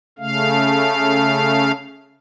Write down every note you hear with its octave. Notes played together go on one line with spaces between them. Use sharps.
C#3 A3 F5